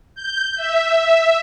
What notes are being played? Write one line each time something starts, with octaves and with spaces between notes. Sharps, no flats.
G6
E5
E5